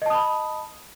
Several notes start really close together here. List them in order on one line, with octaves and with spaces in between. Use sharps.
D#5 A5 D#6 B5